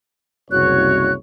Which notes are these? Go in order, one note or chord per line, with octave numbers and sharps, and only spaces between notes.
F#1 C2 F#4 C#5 F#6